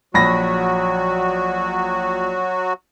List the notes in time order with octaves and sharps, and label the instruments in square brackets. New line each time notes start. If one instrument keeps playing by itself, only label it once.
[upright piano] A#1 B5 A#6 [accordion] F#3 F#4